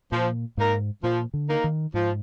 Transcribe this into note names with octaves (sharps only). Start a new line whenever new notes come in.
A#2 F3
G#2 A#3 D#4 A#4
A#2 F3
D3
A#3 D#4 A#4
D#3
G#2 F3